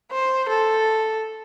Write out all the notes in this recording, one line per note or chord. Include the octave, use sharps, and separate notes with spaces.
C5
A4